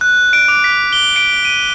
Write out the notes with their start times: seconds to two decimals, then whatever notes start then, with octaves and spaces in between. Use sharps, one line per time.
0.01 F#6
0.33 D7
0.48 D6
0.64 B6
0.93 G7
1.16 D7
1.45 D#7